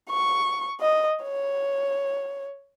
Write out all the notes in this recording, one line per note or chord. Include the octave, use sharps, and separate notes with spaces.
C#6
D#5
C#5